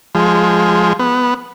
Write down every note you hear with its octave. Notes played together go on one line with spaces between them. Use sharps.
F3 G#3
B3